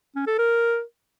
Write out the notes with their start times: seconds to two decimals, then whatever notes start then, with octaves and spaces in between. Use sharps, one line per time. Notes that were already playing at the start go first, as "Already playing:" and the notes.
0.16 C#4
0.27 A4
0.38 A#4